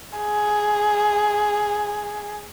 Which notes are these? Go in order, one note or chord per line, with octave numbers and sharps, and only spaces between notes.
G#4